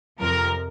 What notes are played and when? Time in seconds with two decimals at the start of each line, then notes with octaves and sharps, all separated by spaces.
0.21 F2 C3 F3 A#4